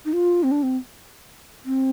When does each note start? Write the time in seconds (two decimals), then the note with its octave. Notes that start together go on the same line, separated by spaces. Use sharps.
0.05 D#4
0.13 F4
0.43 C4
0.51 D4
0.63 C4
1.65 C4